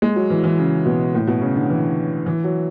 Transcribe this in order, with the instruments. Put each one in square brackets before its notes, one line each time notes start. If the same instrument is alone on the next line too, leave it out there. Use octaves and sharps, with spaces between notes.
[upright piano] G#3
F#3
E3
E3
C#3
B2
A2
B2
C#3
D3
E3
E3
F#3